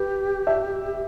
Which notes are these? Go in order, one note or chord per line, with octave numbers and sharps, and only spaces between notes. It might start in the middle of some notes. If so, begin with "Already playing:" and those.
Already playing: G4 B4
E5